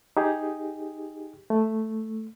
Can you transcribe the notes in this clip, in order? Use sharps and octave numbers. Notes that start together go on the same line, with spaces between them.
D#4 G4 G#4
A3